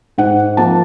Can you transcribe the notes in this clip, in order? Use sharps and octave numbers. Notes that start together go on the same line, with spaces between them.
G#2 F#5
F3 A#3 A5